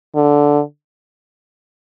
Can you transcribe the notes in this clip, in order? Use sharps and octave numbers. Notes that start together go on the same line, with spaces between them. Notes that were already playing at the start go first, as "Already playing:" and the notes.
D3